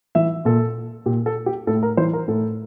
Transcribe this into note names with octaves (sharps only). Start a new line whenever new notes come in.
E3 E5
A#2 A4
A#2 G4
A4
G4
A2 A4
A#4
E3 C5
A#4
A2 A4